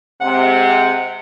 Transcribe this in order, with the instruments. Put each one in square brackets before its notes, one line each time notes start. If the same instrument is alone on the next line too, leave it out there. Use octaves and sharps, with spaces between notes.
[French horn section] C3 G#3 C4 [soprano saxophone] F#5